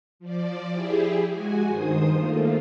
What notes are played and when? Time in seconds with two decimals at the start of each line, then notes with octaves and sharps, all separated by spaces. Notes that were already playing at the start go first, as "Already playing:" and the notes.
0.19 F3 D5
0.72 E4 G4 G#4
1.31 G#3 F#4 G#5
1.67 G2 D#3 C5 D#6
2.12 A3 A#3 F4